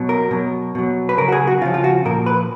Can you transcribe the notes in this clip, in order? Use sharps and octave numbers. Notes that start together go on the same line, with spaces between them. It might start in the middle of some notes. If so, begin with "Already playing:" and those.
Already playing: B2 F#3
A#4
B2 F#3
B2 F#3
B4
C#3 F#3 A#4
F#4
G#4
F#4
C#3 F3 F4
F4
F#4
A#2 F3 A#4
B4